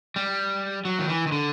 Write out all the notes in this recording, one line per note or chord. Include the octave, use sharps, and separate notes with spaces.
G3
F#3
D#3
E3
D#3
D3